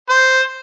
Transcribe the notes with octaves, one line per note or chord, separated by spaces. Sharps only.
C5